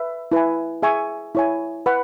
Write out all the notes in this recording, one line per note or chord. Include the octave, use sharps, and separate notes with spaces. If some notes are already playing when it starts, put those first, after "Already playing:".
Already playing: B4 E5
E4 B4 G#5
G#4 E5 G#5 C#6
E4 C#5 G#5
B4 F#5 B5